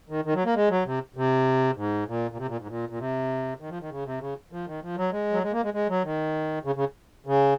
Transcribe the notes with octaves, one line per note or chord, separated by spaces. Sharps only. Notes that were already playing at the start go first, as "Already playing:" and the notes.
D#3
D#3
F#3
A#3
G#3
F#3
C3
C3
G#2
A#2
A#2
C3
A#2
G#2
A#2
A#2
C3
D#3
F3
D#3
C#3
C3
C#3
F3
D#3
F3
F#3
G#3
F#3
G#3
A#3
G#3
G#3
F#3
D#3
C#3
C#3
C#3